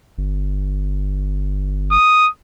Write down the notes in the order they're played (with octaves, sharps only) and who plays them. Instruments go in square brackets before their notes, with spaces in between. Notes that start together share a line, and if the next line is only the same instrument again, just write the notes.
[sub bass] G1
[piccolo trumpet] D#6